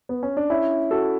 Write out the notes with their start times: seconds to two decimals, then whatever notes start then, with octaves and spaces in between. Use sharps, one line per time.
0.09 B3
0.23 C#4
0.37 D4
0.50 C#4 E4
0.91 F#4 A4